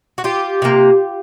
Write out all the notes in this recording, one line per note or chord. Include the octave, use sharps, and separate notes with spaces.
F#4
F4 G4
C3 F3 A#3